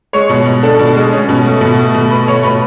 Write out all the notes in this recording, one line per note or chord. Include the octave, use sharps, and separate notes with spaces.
G#3 C#5
B2
B2
D4 A4
B2
G#3
C#4
B2
A3
B2
A3
B2
A3 B4
B2 C#5
B2 B4